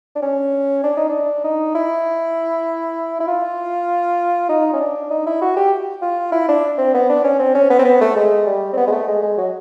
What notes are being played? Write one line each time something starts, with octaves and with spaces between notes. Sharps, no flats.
D4
C#4
D4
D#4
D4
D#4
E4
E4
F4
D#4
C#4
D4
D#4
E4
F#4
G4
F4
E4
D4
C4
B3
D4
C#4
C4
C#4
B3
C4
B3
A3
G#3
G3
C4
B3
G#3
A3
G#3
G#3
F#3